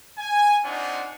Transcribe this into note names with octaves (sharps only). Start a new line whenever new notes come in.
G#5
C4 D4 D#4 F4 F#5 G#5